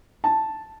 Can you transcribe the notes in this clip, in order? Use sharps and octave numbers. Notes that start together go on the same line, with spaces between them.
A5